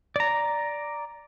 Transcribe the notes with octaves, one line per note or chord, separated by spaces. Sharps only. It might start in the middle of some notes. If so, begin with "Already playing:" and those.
D5 A#5